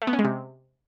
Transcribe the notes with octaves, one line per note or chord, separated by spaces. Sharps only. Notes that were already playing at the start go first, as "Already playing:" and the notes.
A3
B3
C#4
G#3
C3